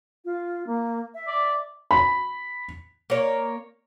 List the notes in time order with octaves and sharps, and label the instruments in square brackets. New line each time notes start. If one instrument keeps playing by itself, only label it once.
[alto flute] F4
A#3
E5
[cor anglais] D5
[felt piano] B5
[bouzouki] A#3 C#5